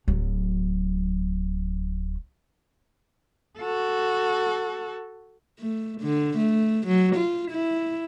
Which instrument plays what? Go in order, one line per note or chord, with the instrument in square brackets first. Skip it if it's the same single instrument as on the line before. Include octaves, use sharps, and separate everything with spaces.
[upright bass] D1 F#3
[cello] F#4 A4
[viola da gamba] A3
D3
A3
F#3
F4
E4